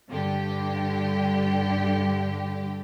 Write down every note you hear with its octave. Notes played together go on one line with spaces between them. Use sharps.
G2 D3 G4